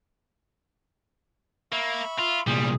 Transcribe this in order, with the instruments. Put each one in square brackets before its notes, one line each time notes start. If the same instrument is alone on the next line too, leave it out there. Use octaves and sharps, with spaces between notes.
[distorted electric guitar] A#3 [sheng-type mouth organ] E5 B5 C#6
[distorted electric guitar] F4
[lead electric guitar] C2 A#2 [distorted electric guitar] G3 [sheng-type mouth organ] G#4